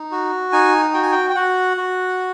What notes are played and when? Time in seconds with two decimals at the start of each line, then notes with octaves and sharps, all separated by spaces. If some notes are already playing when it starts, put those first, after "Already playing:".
Already playing: D#4
0.12 F#4
0.53 D#4 G#5
0.94 F#4 G5
1.03 G#5
1.12 G5
1.30 G5
1.35 F#4 F#5
1.77 F#4